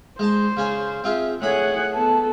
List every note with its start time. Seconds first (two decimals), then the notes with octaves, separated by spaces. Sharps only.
0.19 G#3 C5 A5
0.57 C#3 C#4 G#5
1.04 C4 F4 G#4 E5
1.42 A2 G#4 C#5 F#5 B5
1.93 B3 A4 A5